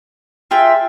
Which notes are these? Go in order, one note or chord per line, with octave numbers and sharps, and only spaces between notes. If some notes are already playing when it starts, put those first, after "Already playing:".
F4 G#4 E5 G5